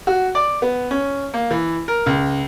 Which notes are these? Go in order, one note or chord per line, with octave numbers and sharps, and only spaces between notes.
F#4
D5
B3
C#4
A#3
E3
A#4
C#2